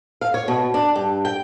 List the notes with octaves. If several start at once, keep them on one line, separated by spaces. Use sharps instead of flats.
F5
C#5
B2
D4
G2
G5